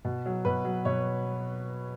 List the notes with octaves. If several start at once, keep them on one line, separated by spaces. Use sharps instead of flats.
B2
F#3
B2 B4
F#3
B2 C#5